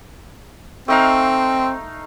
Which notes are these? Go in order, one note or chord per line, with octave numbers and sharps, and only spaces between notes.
A3 C4 D#4 F5